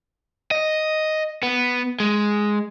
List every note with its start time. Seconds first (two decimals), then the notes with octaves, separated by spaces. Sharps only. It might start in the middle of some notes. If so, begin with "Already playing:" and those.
0.51 D#5
1.43 B3
2.00 G#3